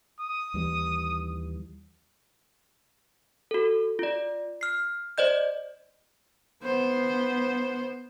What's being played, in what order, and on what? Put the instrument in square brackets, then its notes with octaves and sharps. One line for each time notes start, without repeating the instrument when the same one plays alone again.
[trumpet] D#6
[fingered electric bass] D#2 E3 G3
[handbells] F#4 A4
F4 D5
F6 C7
C5 D5 D#5 G6
[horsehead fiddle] B3 C5